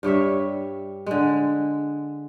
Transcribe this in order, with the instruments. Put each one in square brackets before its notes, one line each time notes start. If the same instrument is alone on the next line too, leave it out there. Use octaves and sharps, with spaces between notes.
[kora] G2 G3 C#5 E5
D3 G#3